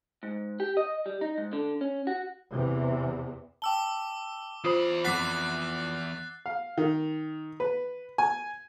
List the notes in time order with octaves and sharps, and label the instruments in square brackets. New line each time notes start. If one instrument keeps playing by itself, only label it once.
[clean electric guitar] G#2
G4
D#5
G3
D#4
G#2
D3
C#4
F#4
[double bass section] E2 C3 E3
[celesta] G5 A5 [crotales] D6 E6 G7
[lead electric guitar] E2 B5 [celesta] F4 C5 C7 [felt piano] D#6
[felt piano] F2 B6 [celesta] F#5 D6 [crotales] F#6 A6 C7
[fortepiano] F5
D#3
B4
G#5